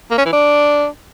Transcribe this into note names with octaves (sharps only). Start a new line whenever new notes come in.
A#3
C#4
E3
D4